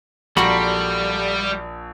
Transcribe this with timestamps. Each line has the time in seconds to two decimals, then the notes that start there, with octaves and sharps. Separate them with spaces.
0.37 A#1 G3 F#4 A4 A#4 B5 C6